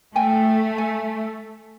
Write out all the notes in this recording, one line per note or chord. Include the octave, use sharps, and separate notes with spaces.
A3 G5 G#5
G#5